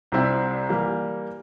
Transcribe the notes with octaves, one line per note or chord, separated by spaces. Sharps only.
C2 C3 G3 C4 E4
E3 G3 A#3